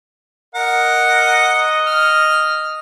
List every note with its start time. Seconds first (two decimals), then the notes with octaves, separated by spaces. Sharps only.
0.55 A#4 D#5 F#5
1.87 F6